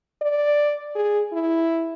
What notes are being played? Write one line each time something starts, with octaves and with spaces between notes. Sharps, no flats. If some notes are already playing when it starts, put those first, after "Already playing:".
D5
G#4
E4